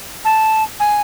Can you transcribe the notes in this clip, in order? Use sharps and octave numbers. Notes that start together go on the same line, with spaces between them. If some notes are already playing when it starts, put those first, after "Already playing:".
A5
G#5